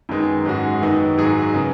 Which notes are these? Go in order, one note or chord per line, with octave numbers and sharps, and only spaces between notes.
F#2 D#3 G#3 B3 D#4
G#2 G#3 C#4 F#4
F#2 D#3 B3 D#4
G#2 F#3 D#4 G#4
C#3 B3